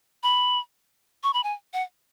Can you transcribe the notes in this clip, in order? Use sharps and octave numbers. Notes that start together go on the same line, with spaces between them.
B5
C#6
B5
G#5
F#5